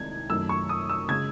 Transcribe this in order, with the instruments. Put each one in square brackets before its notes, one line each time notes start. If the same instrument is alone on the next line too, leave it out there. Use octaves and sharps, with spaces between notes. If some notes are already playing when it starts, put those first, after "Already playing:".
Already playing: [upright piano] C2 C3 D#3 G#3 G#6
F#2 D#3 A3 E6
C#6
D#6
E6
C#3 G#3 G#6